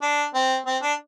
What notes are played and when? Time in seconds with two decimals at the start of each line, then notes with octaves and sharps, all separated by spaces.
0.02 D4
0.34 C4
0.66 C4
0.82 D4